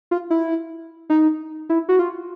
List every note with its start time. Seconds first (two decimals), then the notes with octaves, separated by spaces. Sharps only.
0.11 F4
0.30 E4
1.10 D#4
1.70 E4
1.89 F#4
1.99 F4